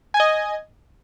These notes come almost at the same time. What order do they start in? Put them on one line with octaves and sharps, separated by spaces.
G#5 G#6 D#5